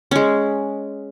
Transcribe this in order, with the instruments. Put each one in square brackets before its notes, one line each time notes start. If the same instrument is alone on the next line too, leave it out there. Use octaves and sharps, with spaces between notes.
[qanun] G#3 C#4